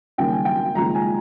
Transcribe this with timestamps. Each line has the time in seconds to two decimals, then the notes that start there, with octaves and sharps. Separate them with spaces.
0.18 D#2 C#3 G3 A#3 C#4 G5
0.32 G#5
0.45 G5
0.75 D#2 C#3 F3 G#3 A#5
0.95 G#5